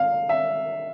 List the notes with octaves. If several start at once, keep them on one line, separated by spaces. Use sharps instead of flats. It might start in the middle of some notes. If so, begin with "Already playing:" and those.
Already playing: F5
E5